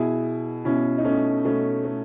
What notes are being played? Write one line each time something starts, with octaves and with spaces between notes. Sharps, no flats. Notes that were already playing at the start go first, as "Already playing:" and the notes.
Already playing: B2 E4 G#4
B2 C#4 E4
D#4
A3 C#4
B2 A3 C#4
A3